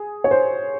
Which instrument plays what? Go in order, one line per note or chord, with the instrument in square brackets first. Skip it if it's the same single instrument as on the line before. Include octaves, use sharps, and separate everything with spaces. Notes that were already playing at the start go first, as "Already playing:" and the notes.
Already playing: [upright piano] G#4
C#5
C5